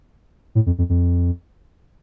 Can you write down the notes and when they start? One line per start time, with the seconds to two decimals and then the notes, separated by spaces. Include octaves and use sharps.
0.55 A2
0.66 F2
0.78 F2
0.89 F2